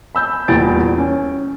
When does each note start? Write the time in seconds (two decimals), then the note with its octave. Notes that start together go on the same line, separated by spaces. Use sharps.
0.15 B5 E6 G6
0.48 D#1 E2 G3 A6 D7
0.98 C#4